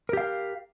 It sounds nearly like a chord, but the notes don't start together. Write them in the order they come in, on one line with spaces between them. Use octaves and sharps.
A#4 G4 F5